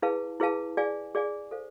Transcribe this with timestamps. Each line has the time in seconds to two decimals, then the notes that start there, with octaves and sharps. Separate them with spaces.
0.02 E4 G#4 B4 F5 A5
0.40 E4 G#4 B4 F5 A5
0.77 G#4 D5 F5 G#5
1.15 G#4 D5 F5 G#5
1.51 A4 C5 F5